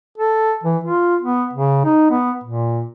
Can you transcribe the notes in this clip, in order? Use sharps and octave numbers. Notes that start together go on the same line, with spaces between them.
A4
E3
F4
B3
C#3
D#4
B3
A#2